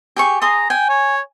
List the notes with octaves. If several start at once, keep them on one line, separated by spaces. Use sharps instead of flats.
G4 G#4 C#6
G#4 A#5 C6 D#6
G5 G#5
C#5